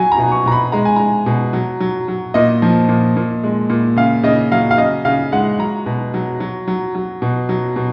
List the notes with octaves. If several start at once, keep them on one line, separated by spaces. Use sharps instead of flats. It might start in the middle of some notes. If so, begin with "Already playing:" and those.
Already playing: F#3 G#5
A#5
B2
C#6
B2 A#5
B5
G#3 A#5
G#5
G#3 A#5
B2
F#3
F#3
F#3
A#2 D#5
F3
A#2
A#2
G#3
A#2
C#3 F5
C#3 D#5
F#3 F5
F5
C#3 D#5
C#3 F5
G#3 F#5
F#3 A#5
B2
F#3
F#3
F#3
F#3
B2
F#3
B2